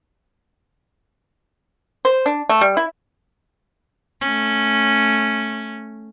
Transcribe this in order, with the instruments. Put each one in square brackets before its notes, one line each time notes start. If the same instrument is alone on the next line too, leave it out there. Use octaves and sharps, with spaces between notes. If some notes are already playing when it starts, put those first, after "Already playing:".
[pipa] C5
D4
A3
G3
E4
[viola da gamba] A3 C#4